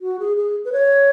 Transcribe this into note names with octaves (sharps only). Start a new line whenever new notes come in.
F#4
G#4
G#4
B4
C#5